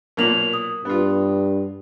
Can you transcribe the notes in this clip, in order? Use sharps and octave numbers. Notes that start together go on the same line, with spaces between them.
B1 A#2 A#3 A#4 F7 F#7
D#6
G2 B3 F4